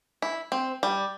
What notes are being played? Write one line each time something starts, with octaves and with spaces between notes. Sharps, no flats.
E4
C4
G3